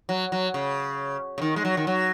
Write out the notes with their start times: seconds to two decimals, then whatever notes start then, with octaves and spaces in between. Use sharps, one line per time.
0.09 F#3
0.32 F#3
0.54 C#3
1.38 C#3
1.42 D#3
1.56 G#3
1.65 F#3
1.77 D#3
1.87 F#3